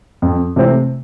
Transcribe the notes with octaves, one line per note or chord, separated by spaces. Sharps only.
F2
C3 E3 A3 C4